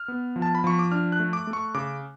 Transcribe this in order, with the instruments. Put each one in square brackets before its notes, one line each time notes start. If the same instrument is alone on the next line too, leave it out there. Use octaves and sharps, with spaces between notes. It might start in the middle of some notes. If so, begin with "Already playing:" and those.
Already playing: [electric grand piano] F6
B3
F3
A5
B5
F3 C#6
D6
D4 F6
F#6
A3
D6
A3
C#6
C#3 D6